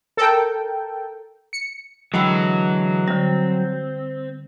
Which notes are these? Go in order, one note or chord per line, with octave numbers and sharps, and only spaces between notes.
A4 A#4 G5
C#7
D3 E3 F#3 G#3 G5 B5 E6
D3 G3 C4